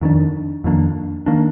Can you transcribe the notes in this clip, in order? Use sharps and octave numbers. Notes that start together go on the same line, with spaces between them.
F2 D#3 A#3 D4
F2 D#3 A#3 D4
D#3 A#3 D4